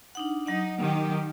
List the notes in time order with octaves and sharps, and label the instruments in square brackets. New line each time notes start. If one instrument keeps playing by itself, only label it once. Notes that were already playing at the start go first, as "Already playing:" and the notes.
[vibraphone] D4 D#4 F#5
[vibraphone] F#3 F#5 [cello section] D#4
[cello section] D#3 G4